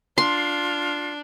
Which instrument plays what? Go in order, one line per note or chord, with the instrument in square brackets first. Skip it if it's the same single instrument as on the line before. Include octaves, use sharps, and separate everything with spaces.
[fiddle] D4 [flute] F4 [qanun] C6